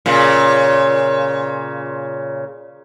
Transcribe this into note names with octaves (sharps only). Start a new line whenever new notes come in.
A#2 C#3